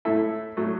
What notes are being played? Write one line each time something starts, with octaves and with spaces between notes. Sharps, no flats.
A2 A3 E4 A4
A2 F#3 A3